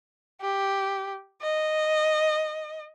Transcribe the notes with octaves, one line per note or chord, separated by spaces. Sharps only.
G4
D#5